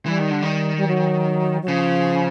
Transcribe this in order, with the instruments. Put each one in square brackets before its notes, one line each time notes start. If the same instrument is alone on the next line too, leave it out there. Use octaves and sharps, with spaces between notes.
[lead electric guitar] E3 [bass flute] G3
[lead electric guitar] D#3
D3
D#3
[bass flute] G3
F#3
F#3
[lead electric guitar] C#3 [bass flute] F3